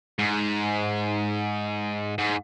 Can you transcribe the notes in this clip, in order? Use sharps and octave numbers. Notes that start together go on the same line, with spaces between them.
G#2
G#2